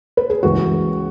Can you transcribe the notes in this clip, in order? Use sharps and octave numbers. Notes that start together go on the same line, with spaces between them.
B4
G#4
C#2 C#3 E3 F#4